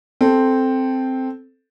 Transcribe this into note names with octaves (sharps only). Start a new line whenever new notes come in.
C4 A4